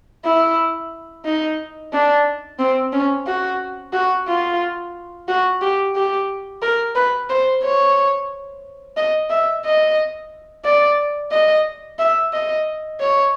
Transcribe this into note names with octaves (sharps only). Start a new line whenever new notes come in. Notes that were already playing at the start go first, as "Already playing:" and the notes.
E4
D#4
D4
C4
C#4
F#4
F#4
F4
F#4
G4
G4
A#4
B4
C5
C#5
D#5
E5
D#5
D5
D#5
E5
D#5
C#5